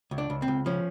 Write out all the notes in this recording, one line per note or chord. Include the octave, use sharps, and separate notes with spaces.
C#2
D4
C#2
C4
C#2
F3 C#4